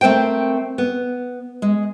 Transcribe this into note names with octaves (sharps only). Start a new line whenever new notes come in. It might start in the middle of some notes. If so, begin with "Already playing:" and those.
A3 C4 A#4 C5 G5
B3
G#3